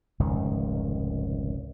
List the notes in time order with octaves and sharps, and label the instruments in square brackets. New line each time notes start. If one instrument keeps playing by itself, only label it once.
[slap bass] F1 C#2 G#2 D#3